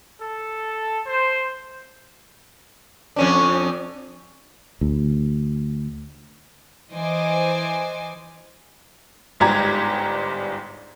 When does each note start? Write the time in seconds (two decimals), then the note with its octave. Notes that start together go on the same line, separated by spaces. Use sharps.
0.21 A4
1.06 C5
3.16 F2 C#4 D4
4.81 D2
6.94 E3 C5 D#5 G#5 D6
9.40 G1 G#2 G3 G4 A#5 G#6